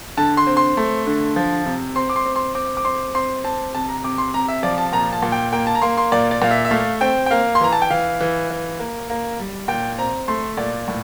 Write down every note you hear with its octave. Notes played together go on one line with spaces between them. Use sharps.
D3 A5
C6
C4
C6
A3
D3
F3
C3
C4 C6
D6
C6
C4
C6
C4 D6
D6
C4 C6
C4 C6
C4 A5
C3 A5
A#5
C3 D6
C6
C3 A#5
E5
F3 D5
A5
A#2 A#5
A5
A#2
G5
A#3 G5
A5
A#5
A#3 C6
C6
A#2 D5
D5
A#2 F5
E5
E5
A3 F5
C4 G5
G5
A#3 F5
C6
E3 A#5
A5
G5
E3 F5
E3
E3
A#3
A#3
G3
A#2 G5
C4 A#5
A3 C6
A#2 D5
A2